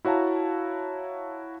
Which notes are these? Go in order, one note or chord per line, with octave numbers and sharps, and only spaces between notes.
E4 F#4 C#5 F5 A5 A#5